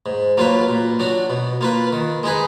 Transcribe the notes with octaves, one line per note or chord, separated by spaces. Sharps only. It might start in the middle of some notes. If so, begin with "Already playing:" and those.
G#2
F#3 A#3 F4 B4
A#2
F#3 D4 F#4
B2
A#3 F4 B4
D#3
G#3 D#4 G#4 B4